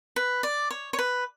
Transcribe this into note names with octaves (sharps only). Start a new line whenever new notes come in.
B4
D5
C#5
C#5
B4